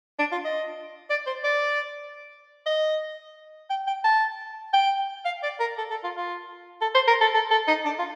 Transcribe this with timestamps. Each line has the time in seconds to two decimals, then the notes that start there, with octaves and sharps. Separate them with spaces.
0.19 D4
0.32 F4
0.44 D#5
1.10 D5
1.26 C5
1.44 D5
2.66 D#5
3.70 G5
3.87 G5
4.04 A5
4.73 G5
5.25 F5
5.43 D5
5.60 A#4
5.78 A4
5.90 A4
6.04 F4
6.17 F4
6.81 A4
6.94 C5
7.08 A#4
7.21 A4
7.34 A4
7.51 A4
7.68 D#4
7.85 D4
7.99 F4